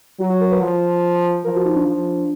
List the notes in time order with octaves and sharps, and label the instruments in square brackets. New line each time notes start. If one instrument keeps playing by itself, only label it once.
[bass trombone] F#3 [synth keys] F#4
[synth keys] F#4
A#4
B4
[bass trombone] F3
[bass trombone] F3 [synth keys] A#4
[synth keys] F#4
D#4
D4
[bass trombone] F3